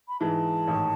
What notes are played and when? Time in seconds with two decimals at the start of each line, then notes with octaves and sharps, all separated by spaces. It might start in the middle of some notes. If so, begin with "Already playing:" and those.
0.08 B5
0.20 G#2 E3 G#3 A5
0.67 A1 G#2 D#3